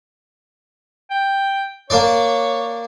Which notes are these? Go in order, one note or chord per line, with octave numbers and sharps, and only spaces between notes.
G5
A#3 D4 C#5 D5